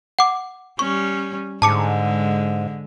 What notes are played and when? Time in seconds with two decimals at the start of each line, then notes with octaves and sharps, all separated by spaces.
0.19 F#5 D6
0.79 G3 C#4 C#6
1.62 G#2 D3 G#3 A5 D6 C#7